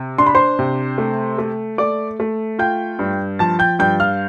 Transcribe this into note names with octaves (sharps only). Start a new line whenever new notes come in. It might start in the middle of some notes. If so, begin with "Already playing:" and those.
Already playing: C3
D4 C6
B5
C5 C6
C3
A3
A3
A3 D5 D6
A3
F4 G5 G6
G2
F3 A5 A6
G5 G6
G2 G5 G6
F5 F6